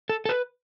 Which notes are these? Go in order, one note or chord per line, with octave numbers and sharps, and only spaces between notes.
A4
A4
B4